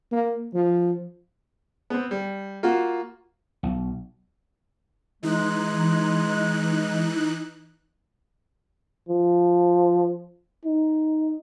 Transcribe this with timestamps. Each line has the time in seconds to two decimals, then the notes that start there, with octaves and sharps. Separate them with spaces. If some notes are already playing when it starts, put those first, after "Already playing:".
0.12 A#3
0.54 F3
1.90 B3 C4
2.11 G3
2.63 A#3 F4 F#4
3.63 B1
5.23 E3 G#3 D#4 F#6
9.09 F3
10.65 D#4